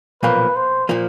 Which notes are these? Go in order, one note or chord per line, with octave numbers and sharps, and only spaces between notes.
B1 A#2 F3 A#3 B4
C5
A#2 F3 A#3